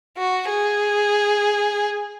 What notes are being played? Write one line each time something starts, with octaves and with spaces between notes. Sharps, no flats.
F#4
G#4